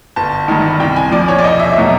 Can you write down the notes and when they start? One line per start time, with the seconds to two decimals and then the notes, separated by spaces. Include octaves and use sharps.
0.16 G1 A5
0.48 G2 D#3
0.80 C2 G5
0.96 G#5
1.11 A#2 F3 D5
1.28 C#5
1.38 D5
1.44 E1 D#5
1.60 E5
1.76 B2 F#3 E5